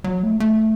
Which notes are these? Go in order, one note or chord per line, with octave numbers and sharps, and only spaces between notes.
F#3
A3
A3